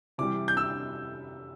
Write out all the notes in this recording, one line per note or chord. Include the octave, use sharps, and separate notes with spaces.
C3 E3 G3 D6
G6
E6